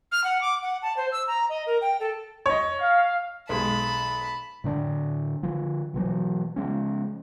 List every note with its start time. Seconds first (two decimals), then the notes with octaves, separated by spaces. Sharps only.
0.12 F6
0.24 F#5
0.41 D6
0.62 F#5
0.82 A5
0.97 C5
1.12 E6
1.27 A#5
1.49 D#5
1.67 A#4
1.81 G5
2.00 A4
2.46 C#5 D#5
2.79 F5
3.49 B1 G#3 A5 B5
4.64 A2 D3 C4 D4
5.43 D3 F3
5.94 B2 E3 F#3
6.56 C#3 F3 G#3 C#4